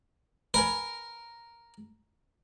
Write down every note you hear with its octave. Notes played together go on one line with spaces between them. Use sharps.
A#4 B4 G#5 B5